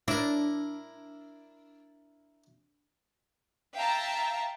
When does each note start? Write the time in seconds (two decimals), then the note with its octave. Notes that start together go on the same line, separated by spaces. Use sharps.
0.08 D4 E4 A#4
3.75 E5 F5 G5 A5 A#5